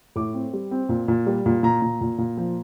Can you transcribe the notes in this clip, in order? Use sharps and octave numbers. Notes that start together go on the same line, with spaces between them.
A2 D6
C4
G3
C4
A#2
A#2
G3
A#2
A#2 A#5
A#2
A#2
A#2
F3